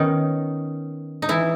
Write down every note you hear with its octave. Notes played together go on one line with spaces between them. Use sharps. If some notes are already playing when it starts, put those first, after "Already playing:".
Already playing: D#3 B3 C#4 D#4
D#4
E3 E4